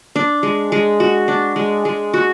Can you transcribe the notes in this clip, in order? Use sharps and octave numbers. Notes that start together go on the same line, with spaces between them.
D4
G#3
G#3
F#4
D4
G#3
G#3
F#4